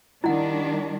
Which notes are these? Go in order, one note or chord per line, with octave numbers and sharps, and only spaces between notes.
D#3 G3 D4 E4 F#5